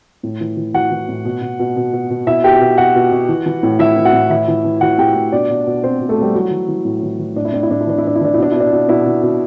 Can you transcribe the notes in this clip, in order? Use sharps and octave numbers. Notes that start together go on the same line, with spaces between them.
A2
E3
E3
E3 F#4 F#5
E3
A2
B2
B2
B2
B2
B2
B2
B2 E4 E5
B2 G4 G5
B2
B2 F#4 F#5
B2
B2
E3
E3
A2
E3 E4 E5
E3
F#4 F#5
A2
E3 E4 E5
E3
E3
E3 F#4 F#5
A2 G4 G5
A2
B2 D4 D5
B2
B2
B2 C4 C5
B2
A3 A4
B2 G3 G4
E3 F#3 F#4
E3
E3
A2
E3
E3
A2 D4
E4
A2 D4
E4
A2 D4
E4
E3 D4
E4
E3 D4
E4
E3 D4
E4
B2 D4
B2 E4
D4
B2
B2 E4
B2
B2